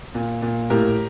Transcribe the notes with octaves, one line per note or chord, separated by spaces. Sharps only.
A#2
A#2
A2 G4 A#4